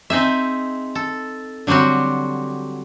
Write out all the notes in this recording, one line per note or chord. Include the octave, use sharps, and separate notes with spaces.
C4 D#4 G#4 E5
A4
D3 F#3 G3 C4 F#4